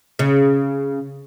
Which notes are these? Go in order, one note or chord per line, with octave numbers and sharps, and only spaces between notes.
C#3